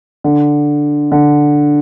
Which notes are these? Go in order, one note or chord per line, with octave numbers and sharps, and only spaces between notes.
D3
D3